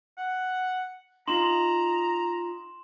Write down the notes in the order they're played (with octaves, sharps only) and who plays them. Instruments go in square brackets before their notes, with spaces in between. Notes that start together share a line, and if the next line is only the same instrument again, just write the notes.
[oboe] F#5
[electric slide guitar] D#4 F4 [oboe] A#5 [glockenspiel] C6 E7 F#7